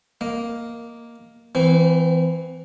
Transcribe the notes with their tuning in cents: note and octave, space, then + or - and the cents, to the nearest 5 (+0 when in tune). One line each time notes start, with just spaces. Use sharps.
A#3 +0 D#5 +0
E3 +0 C4 -35